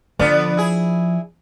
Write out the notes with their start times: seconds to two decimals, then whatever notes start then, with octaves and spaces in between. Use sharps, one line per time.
0.19 D3 F3 B3 D5
0.57 E4 G#4